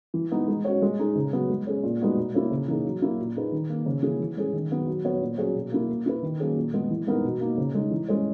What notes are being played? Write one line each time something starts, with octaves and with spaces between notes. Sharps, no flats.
E3
G#3 B3 D#4
G#3
C#4 F#4 C#5
G#3
D#4 G#4
C#3
F#3 B3
G#3
C#4 G#4
A#2
G#3 B3 D#4 F#4
B2
A#3 C#4 E4 A#4
C#3
E3 A#3 D#4 G#4
F#3
A#3 E4
A#2
A#3 D#4 G#4 B4
D#3
A#3 D#4
C#3
E3 A#3 E4 G#4
E3
G#3 C#4 G#4
D#3
F#3 B3 D#4
F#3
B3 F#4 C#5
A#2
F#3 C#4 G#4 C#5
B2
A#3 E4 A#4
A#3
E4 B4
D#3
F#3 A#3 C#4 G#4
A#2
G#3 B3
E3
G#3 B3 D#4 A#4
B2
A#3 D#4
C#3
G#3 D#4
E3
G#3 C#4